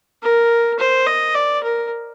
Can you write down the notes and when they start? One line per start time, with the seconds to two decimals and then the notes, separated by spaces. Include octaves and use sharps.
0.22 A#4
0.79 C5
1.07 D#5
1.35 D5
1.63 A#4